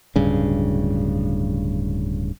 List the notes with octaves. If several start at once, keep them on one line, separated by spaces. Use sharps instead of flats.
D1 G2 C#3